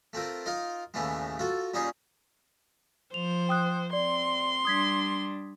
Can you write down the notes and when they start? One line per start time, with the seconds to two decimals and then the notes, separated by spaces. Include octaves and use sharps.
0.13 A3 C4 F4 A#4
0.46 D#4 F4 A#4 F5
0.94 D#2 A2 C#3 E3 A3 B3
1.39 F4 F#4 A4
1.74 A#2 G3 C#4 D#4 G#4
3.14 F3 C5 F7
3.49 G5 D#6 F#6
3.93 C4 D5 C6
4.65 G3 D4 D#6 G#6 B6